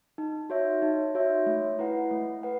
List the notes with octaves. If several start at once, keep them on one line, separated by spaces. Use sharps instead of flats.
D#4
F#4 C#5 E5
D#4
F#4 C#5 E5
A3
E4 B4 F#5
A3
B4 F#5